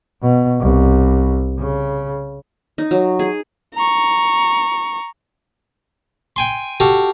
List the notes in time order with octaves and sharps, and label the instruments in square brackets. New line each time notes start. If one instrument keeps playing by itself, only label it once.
[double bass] B2
C2
C#3
[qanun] D#4
F#3
G#4
[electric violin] A#5 C#6
[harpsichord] G5 G#5 C6
F#4 G4 A4 F5